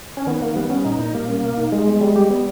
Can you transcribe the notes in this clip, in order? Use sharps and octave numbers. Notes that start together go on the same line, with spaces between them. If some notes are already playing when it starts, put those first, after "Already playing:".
C#4
D#3 B3
D#3 A#3
G3 B3
C#4
A#2 D#4
A#2 D#4
G3 A#3
C#4
B2
D#4
G3 G#3
B3
G3
G4
G3 B3